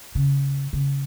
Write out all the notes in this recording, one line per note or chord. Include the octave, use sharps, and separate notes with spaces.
C#3
C#3